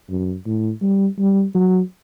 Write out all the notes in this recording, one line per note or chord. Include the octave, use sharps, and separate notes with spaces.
F#2
A2
G3
G3
F#3